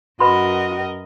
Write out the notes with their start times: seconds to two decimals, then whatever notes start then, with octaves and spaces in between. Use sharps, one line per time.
0.20 F#2 F#4 A#4 B4 D#5 B5 C6